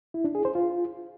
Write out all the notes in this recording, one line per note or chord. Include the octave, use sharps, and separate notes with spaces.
E4
D4
G#4
C5
F4